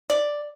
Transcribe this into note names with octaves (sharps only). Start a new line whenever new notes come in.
D5